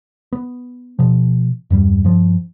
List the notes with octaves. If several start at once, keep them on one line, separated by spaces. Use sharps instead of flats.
B3
B2 F3
E2 G2 G3
G2 F3